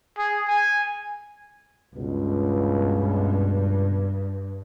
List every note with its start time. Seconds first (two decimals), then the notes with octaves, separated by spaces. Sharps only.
0.18 G#4
0.48 G#5
1.95 C#2 G2 B2